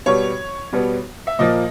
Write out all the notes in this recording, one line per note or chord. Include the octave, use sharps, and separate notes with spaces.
B2 G3 B3 C#5
B2 G3 B3
E5
A#2 F3 A#3 D#5